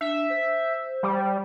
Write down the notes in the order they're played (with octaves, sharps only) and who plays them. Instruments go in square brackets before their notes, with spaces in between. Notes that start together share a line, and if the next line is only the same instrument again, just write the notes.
[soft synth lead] D4 [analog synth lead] E5
[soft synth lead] C5
[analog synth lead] G3